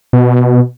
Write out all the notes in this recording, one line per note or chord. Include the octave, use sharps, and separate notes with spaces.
B2